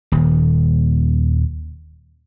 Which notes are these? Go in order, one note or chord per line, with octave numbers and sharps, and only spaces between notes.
D#1 D#2